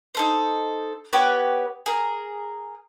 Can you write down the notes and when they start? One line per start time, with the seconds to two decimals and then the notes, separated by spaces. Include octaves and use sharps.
0.15 D#4 A4 C5
1.13 B3 G4 B4 C#5
1.86 G#4 A#4